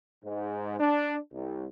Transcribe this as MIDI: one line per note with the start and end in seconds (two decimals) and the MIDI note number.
0.24 0.78 44
0.79 1.16 62
1.32 1.65 36